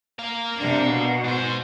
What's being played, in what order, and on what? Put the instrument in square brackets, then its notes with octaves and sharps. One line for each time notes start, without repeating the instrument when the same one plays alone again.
[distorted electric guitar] A#4 F5
[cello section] C3 D4
B2
[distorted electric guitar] G#2 C5